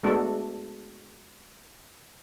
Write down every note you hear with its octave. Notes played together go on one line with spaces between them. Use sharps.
G#3 A3 B3 D4 F#4 A4